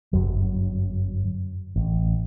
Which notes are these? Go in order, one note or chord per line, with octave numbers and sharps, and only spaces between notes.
G1 F#2 F#3
A1